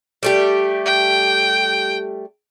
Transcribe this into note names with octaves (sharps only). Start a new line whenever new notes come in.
G3 A3 G4
G5